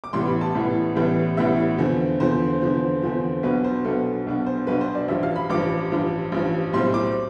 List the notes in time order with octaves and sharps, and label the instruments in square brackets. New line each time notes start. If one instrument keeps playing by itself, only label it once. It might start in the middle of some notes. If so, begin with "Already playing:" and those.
[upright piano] D6
A1 A2 E3 G3 B3 C6
B5
A5
A1 A2 E3 G3 B3
A1 A2 E3 G3 B3
A1 A2 E3 G3 B3 E5
E2 D3 F3 C4
E2 D3 F3 C4 C5
E2 D3 F3 C4
E2 D3 F3 C4
B1 B2 B3 D4 B4
C5
B1 B2 B3 D4 A4
B1 B2 B3 D4
C5
B1 B2 B3 D4 B4
C5
D5
A1 G2 F3 E5
F5
B5
A1 G2 F3 D6
A1 G2 F3
A1 G2 F3
B1 A2 G3 C4 C6
D6